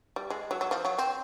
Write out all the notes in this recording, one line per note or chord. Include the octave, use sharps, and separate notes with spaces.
G3
G#3
F#3
F#3
F3
F#3
C4